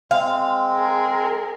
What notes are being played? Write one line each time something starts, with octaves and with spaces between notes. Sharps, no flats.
G#3 C4 F5
G#4 A#4